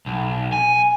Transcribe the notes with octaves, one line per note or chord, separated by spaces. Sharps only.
B1
G#5